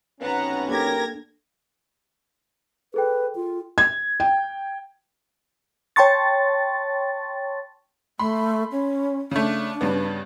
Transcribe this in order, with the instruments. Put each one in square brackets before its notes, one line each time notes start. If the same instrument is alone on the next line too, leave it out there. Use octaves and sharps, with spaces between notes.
[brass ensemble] B1 C3 C#4 [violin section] B3 F#5 A#5
[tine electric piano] A#3 D4 A4 [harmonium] G4 A#4 [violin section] G#6 A#6
[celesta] G#4 A4 G5 [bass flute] B4
[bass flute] F4
[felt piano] G#6
G5
[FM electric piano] C#5 G5 A5 C6 C#6 A6
[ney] A3 [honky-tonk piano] B5 C6
[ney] C#4
[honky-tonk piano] C#3 A3 [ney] D4
[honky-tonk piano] G2 C#3 B3